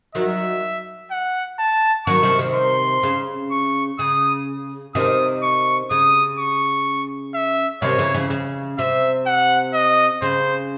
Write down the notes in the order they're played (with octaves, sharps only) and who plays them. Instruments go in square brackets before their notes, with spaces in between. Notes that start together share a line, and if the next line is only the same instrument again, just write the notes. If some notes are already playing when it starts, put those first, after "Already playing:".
[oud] D#3 F#3 [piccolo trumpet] E5
[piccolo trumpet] F#5
A5
[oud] D#3 F#3 [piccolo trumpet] C#6
[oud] C3 D#3
C3 D#3
[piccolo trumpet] C6
[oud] C#3
[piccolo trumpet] C#6
[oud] C#3 [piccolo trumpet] D#6
[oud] C3 D#3 [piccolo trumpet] D#6
[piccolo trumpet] C#6
[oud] C#3 [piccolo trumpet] D#6
[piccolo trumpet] C#6
E5
[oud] C3 D#3 [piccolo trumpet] C#5
[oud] C#3 E3
C#3 E3
C#3
[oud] C3 [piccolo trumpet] E5
[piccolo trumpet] F#5
D#5
[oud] C#3 [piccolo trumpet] C5